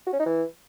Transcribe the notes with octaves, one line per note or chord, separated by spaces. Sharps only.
F#4
C#4
D#4
E3